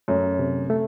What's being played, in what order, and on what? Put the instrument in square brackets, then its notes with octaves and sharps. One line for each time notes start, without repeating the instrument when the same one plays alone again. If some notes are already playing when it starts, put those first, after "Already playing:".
[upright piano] F#2 [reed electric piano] A3
[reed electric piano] C3
A3